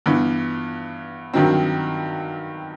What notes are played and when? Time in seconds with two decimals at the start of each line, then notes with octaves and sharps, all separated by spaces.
0.06 G2 E3 B3
1.34 G2 D#3 F#3 C4